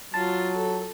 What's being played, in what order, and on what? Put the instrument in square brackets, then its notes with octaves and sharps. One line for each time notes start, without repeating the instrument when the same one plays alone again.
[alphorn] F#3 [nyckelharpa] F4 [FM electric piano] A5
[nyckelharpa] A4